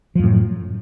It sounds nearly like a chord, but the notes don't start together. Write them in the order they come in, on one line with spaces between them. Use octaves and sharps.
F3 F#2 A2